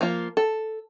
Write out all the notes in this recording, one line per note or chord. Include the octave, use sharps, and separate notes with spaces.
F3 A#3 F4
A4